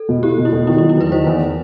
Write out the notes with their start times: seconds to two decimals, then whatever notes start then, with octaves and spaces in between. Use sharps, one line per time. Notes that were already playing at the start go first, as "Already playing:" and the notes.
Already playing: A4
0.09 B2
0.23 E4 G4
0.38 B2
0.45 E4
0.53 B2
0.67 D#3 E4
0.78 E4
0.82 F#3
0.89 E4
0.97 E2 B4
1.11 D#3 C5
1.26 E2